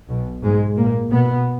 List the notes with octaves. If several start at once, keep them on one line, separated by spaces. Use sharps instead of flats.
B1 B2
G#2 G#3
A#2 A#3
B2 B3